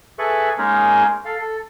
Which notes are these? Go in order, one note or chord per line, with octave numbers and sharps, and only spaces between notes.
G#4 A4 B4 E5 C#6 F#6
G#3 A#3 C#4 D#4 G#4 A#4
A4 F5
A4